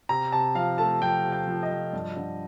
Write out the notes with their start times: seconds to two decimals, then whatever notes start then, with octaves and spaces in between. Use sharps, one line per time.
0.09 C3 A#5
0.32 C3 A5
0.55 F3 F5
0.78 A3 A5
1.01 F3 G5
1.24 C3
1.32 G5
1.48 F3
1.63 D#5
1.71 F3
1.93 G2
2.16 D3